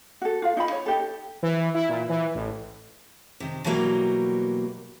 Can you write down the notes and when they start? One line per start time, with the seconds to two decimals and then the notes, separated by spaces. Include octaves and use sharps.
0.22 F#4 A4
0.42 F4 F5
0.57 D#4 F4 B5
0.72 C#5
0.86 D#4 G4 A4
1.43 E3
1.74 E4
1.89 A#2
2.09 E3
2.35 A1
3.40 C3 D#3
3.64 B2 E3 F#3 G3 A#3